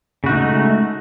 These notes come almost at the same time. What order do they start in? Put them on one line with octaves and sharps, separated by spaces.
C#3 F#4 D#4 A3 G#3